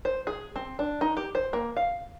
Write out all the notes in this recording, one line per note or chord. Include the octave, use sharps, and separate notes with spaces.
C5
G#4
C4
D4
D#4
G4
C5
A#3
F5